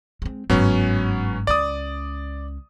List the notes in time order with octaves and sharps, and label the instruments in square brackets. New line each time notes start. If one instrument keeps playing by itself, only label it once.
[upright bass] G#3 C4
[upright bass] G1 G#2 [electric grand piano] F#3 B3 C#4
[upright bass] C#2 C#4 [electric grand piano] D5 D#6